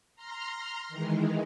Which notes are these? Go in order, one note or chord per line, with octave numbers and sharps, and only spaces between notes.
A#5 C6 F6
D#3 E3 G#3